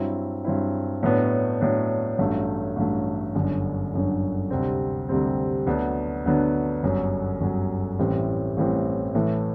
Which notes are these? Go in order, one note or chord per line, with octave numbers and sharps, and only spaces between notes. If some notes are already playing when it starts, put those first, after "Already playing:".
Already playing: G2 F#3 C4 E4
G2 F#3 C4 E4
A2 F#3 B3 D4
A2 F#3 B3 D4
A1 G2 F#3 A3
A1 G2 F#3 A3
G1 F#2 D3
G1 F#2 D3
D2 C3 G3 C4
D2 C3 G3 C4
D2 D3 F#3 B3 D4
D2 D3 F#3 B3 D4
G1 F#2 F#3
G1 F#2 F#3
A1 A2 E3 G3 C4
A1 A2 E3 G3 C4
A2 E3 A3